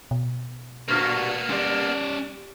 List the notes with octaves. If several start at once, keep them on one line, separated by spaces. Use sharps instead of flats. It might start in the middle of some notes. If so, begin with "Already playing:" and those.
B2
G2 A#2 A#3 B3 F#4
G3 C#4 D5